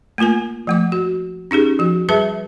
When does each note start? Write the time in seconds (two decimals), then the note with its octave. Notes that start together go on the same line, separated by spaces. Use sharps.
0.18 A3 A#3 F4 A#4 G#5
0.67 F3 A3 D6
0.92 F#4
1.51 C#4 D#4 G4 G#4
1.79 F3 F#4
2.09 G3 G#4 B4 E5 A5